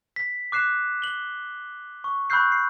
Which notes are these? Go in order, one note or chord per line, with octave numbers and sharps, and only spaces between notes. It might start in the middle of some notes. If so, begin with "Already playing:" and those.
B6
D6 F#6 C7 E7
F#7 G7
C#6
B5 C#6 E6 F#6 G6 C7
C7